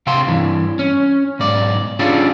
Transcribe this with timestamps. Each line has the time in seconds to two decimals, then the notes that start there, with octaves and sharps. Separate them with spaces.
0.07 C3 F5 G5 A5 C6
0.27 G2 E3
0.79 C#4
1.39 B1 G#2 D5
1.99 C#4 D4 E4 F4 G4 G#4